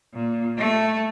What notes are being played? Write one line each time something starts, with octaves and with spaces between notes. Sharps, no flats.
A#2
A3